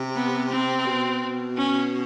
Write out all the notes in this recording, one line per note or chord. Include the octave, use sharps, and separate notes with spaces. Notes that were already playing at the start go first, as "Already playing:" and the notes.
Already playing: C3
B3
C4
B2
C#4